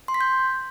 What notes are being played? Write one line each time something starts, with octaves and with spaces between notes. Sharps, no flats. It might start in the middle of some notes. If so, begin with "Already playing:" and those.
C6
B6
G6